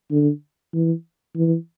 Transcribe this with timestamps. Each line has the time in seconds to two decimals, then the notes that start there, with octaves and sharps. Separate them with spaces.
0.11 D3
0.74 E3
1.35 E3